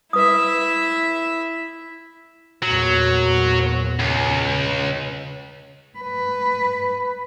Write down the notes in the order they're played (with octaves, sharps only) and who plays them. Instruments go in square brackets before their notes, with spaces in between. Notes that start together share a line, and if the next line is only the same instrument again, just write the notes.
[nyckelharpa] E4 E5 [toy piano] B4 D#6
[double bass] E2 A#2 [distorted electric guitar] F#3
[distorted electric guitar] C#2
[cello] B4